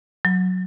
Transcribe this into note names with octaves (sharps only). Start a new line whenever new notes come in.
F#3